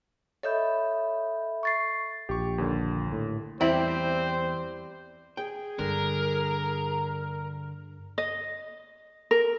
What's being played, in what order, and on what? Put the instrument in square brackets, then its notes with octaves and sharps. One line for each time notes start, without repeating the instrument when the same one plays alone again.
[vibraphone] A4 E5 B5 [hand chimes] C#5 D#5 G6
[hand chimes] C#6 A6 C7
[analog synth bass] A#1 [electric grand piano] G4 C#6
[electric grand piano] D#2 D3
[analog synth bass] A2
[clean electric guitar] E2 [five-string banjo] G3 E4 D5 [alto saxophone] C4 [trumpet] C5
[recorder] G#4 [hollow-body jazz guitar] G5
[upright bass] G2 [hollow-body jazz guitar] D3 [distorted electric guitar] A#4
[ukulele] D#5
A#4